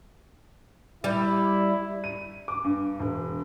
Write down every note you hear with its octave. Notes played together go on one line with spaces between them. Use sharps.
G3 E4
D#7
D6
G2
E1